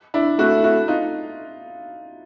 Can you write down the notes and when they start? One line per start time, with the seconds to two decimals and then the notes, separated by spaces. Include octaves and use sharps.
0.14 D4 E4
0.39 A3 E4 F#4
0.64 E4 F#4
0.88 D#4 F4